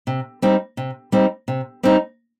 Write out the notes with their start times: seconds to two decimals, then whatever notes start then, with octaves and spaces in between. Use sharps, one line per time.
0.07 C3
0.42 G3 C4 D#4
0.77 C3
1.12 G3 C4 D#4
1.48 C3
1.83 G3 C4 D#4